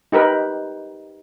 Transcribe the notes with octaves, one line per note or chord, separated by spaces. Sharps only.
D#4 G4 A#4 B4